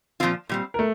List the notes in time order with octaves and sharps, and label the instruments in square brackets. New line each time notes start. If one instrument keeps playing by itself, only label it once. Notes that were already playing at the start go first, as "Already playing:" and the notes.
[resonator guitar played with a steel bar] A#2 F3 C4 F4
A#2 G3 C4
[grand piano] A#4
A3